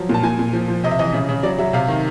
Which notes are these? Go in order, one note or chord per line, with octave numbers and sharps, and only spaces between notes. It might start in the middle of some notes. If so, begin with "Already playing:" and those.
Already playing: F3 F#3
A#2 A5
A#2 G#5
A#2
F3
F3
C3 D#5
E5
E3 D#5
C#3
C#3
F#3 D5
F#3 E5
C3 F5
D#3